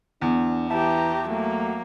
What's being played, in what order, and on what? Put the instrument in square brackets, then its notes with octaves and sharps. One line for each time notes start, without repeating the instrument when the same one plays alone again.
[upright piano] E2 [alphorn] D4
[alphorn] E3 [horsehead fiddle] G4 A#5 [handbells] E5 A5
[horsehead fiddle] F#3 A#3 [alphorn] A3